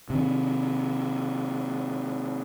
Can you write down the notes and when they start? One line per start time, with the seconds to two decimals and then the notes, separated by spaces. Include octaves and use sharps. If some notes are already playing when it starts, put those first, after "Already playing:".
0.10 C3 D#3